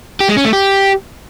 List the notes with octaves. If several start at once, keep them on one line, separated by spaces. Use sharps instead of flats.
G4
G#3
C#4
A3
G4